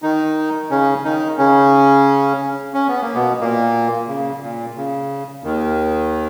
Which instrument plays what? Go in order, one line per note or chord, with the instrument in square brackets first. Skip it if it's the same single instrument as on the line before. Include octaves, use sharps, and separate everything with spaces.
[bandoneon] D#3 D#4
C#3 C#4
D#3 D#4
C#3 C#4
C#4
B3
A#3
B2 B3
A#2 A#3
C#3
A#2
C#3
D#2 D#3